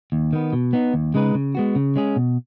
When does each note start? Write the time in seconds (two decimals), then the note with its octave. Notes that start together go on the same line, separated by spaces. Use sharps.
0.12 D#2
0.33 D#3 B3
0.53 B2
0.73 B3 D#4
0.94 D#2
1.14 C#3 G#3 D#4 B4
1.35 C#3
1.55 G#3 B3 F#4
1.75 C#3
1.96 G#3 C#4 G#4
2.16 B2